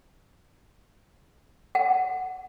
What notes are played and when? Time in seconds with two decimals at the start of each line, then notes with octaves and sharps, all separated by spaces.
1.75 F#5